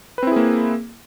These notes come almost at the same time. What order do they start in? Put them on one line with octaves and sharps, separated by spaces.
B4 C4 E4 G#4 A#3